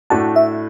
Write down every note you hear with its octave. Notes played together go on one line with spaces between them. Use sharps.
A2 A3 D4 F#4 A5
E5